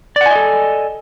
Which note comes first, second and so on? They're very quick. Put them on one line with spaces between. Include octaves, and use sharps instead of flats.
D5 F#5 G#5 D#5 A4